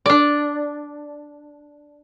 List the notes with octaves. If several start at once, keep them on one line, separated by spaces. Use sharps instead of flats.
D4 D5